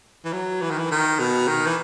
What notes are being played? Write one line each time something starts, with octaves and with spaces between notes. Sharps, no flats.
E3
F#3
E3
D#3
E3
D#3
B2
D#3
E3